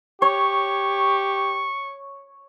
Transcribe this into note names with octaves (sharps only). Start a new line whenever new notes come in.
G4 C#5 C#6